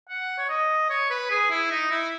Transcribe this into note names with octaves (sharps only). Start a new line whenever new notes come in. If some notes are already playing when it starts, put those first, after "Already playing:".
F#5
C#5
D#5
C#5
B4
G#4
E4
D#4
E4